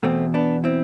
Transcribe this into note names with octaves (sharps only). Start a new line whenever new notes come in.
E2 B2 A3 C4
B3 D4
C4 E4